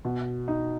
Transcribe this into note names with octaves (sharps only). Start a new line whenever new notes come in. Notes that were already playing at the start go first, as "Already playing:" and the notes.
B2
D#4